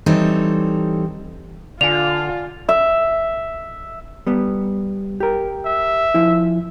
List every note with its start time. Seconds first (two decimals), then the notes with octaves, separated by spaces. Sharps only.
0.06 E3 G3 C4 D#4 A4 C#5
1.81 D3 F4 D5 F5 G#5 F7
2.69 E5
4.27 G3 B3
5.20 G4 A#4
5.65 E5
6.14 F3 E4